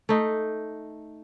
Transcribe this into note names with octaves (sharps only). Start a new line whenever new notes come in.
A3 D#4